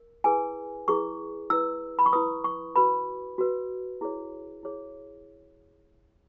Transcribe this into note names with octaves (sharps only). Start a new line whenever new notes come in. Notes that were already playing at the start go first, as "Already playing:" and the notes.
Already playing: A#4
E4 G#4 B4 G#5
E4 G#4 B4 C#6
E4 B4 E6
B5
C#6
E4 B4 D#6
C#6
F#4 B4 B5
F#4 B4
E4 G#4 C#5
E4 G#4 C#5